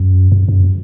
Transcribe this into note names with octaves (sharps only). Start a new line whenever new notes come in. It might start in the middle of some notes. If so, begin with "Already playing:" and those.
Already playing: F#2
F#2
F#2